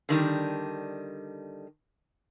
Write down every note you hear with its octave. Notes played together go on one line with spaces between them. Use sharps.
D3 D#3 G3